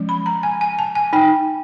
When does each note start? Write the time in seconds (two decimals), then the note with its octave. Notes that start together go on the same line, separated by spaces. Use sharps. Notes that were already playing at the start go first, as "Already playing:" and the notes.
Already playing: F3 G#3 C#4
0.09 B5
0.26 A#5
0.43 G#5
0.61 G#5
0.79 A5
0.95 G#5
1.13 D#4 G5